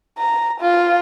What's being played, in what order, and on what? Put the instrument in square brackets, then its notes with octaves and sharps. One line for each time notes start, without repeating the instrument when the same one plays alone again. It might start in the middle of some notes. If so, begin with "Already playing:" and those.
[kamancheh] A#5
F4